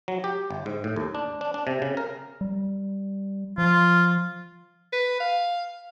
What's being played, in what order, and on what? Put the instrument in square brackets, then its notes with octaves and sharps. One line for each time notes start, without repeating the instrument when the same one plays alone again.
[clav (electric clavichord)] F#3
G4
G1
G#2
A2
D#2
D4
D4
D4
C3
C#3
A#4
[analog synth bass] G3
[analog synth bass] F3 [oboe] F4
[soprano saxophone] B4
F5